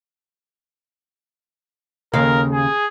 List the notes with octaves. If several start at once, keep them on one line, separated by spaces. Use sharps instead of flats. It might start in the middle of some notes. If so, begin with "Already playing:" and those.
D#2 C#3 A#4 F5
G#4